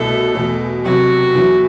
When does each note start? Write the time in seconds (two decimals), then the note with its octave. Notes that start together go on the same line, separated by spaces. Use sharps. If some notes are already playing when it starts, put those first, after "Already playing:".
Already playing: C2 B2 A3 E4 A4
0.35 E2 B2 A3
0.85 C3 F#3 B3 F#4
1.35 E2 D3 F#3 B3 E4